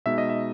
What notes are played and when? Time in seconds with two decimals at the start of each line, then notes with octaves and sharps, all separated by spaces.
0.06 B2 G#3 D#4 E5
0.18 D#5
0.29 E5